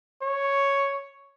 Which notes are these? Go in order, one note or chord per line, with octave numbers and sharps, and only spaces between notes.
C#5